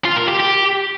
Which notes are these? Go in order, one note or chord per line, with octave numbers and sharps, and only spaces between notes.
F4
A#4
G4
G4